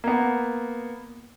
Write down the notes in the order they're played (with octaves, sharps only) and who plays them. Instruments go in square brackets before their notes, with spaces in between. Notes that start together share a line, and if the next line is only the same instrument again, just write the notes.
[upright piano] A#3 B3